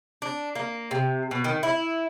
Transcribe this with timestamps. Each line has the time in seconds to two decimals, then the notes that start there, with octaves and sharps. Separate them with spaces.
0.22 D4
0.55 A#3
0.91 C3
1.31 B2
1.44 D#3
1.63 E4